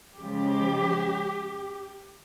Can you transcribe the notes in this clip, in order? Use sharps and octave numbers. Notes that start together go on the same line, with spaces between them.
C#3 F3 G#3 G4